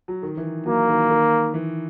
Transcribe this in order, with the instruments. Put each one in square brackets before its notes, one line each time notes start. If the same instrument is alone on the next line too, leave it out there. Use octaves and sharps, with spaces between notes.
[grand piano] F#3
D#3
E3
[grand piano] F#3 [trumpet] A#3
[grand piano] D#3
D#3
E3